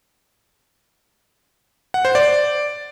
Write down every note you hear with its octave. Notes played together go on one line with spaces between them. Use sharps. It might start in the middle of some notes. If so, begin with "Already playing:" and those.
F#5
C5
D5